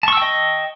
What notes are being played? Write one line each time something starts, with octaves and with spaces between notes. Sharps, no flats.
D#5 G5 A5 C#6 E6